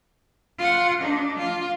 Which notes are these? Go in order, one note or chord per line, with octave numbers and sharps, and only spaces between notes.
F4 F#5
D4 D#4
F4